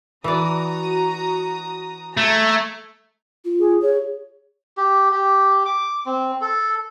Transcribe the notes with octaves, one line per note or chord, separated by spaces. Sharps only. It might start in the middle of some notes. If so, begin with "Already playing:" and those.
E3 F#4 D5 A#5 D#6
A3 A#5 G#6
F4
G#4
G#4 C#5
G4
G4
D6
C4
A4